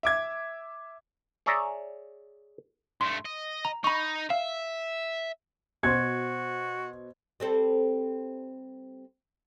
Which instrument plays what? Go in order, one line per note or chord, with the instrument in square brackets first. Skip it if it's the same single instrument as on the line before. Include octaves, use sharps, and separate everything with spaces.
[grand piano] E5 D6 G#6
[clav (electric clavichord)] G#4 C#5 D5 E5 A#5
[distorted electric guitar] G2 A3 [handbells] C6
[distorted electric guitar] D#5
[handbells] A#5
[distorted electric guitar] D#4 [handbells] B5 C#6
[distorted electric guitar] E5 [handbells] F5
[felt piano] B2 C5 C6 [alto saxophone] F#4 [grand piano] G#6
[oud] G3 C4 A4